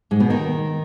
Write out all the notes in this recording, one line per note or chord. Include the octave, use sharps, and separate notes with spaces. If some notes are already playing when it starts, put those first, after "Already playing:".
G#2 G#3
B2 B3
D#3 D#4